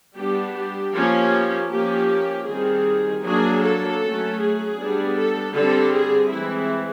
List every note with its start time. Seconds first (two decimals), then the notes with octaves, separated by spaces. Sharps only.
0.16 G3 B3 D4 G4
0.55 G4
0.93 F3 A#3 C#4
1.70 F3 A#3 C#4 G4
2.47 D#3 G3 C4 G#4
3.24 F#3 A#3 D4 G#4
3.63 A4
4.01 F#3 A3 C#4
4.40 G#4
4.78 G3 B3 D4
5.17 A4
5.55 D3 G3 C4 A4
5.94 G#4
6.32 E3 G#3 C4 E4